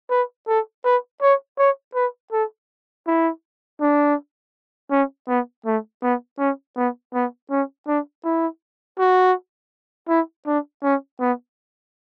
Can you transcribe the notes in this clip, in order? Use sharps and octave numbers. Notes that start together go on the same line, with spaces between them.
B4
A4
B4
C#5
C#5
B4
A4
E4
D4
C#4
B3
A3
B3
C#4
B3
B3
C#4
D4
E4
F#4
E4
D4
C#4
B3